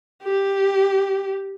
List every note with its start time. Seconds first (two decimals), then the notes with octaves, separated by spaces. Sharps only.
0.23 G4